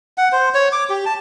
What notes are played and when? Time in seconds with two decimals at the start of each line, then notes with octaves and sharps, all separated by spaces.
0.18 F#5
0.32 C5
0.54 C#5
0.72 D6
0.89 G4
1.06 A5